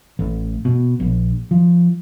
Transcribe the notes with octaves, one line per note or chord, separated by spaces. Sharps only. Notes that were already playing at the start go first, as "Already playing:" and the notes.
A1
B2
A#1
F3